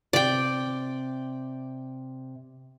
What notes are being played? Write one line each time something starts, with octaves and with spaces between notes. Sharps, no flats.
C3 D5 G5